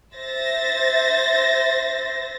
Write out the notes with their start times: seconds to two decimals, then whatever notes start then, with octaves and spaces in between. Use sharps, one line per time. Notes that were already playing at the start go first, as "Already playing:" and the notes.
0.15 C5 E5 A6 A#6